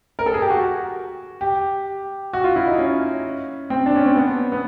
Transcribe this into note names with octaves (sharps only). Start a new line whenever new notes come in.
A#4
A4
G#4
G4
F#4
G4
F#4
F4
E4
D#4
C#4
C4
D4
C#4
C4
B3
B3